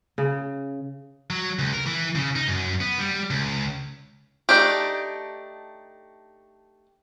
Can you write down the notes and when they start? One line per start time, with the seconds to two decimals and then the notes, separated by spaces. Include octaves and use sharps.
0.18 C#3
1.30 F#3
1.59 C#2
1.73 A#4
1.86 E3
2.15 C#3
2.36 D#4
2.48 F#2
2.81 B3
2.99 G3
3.30 C#2
4.49 A3 D4 D#4 G4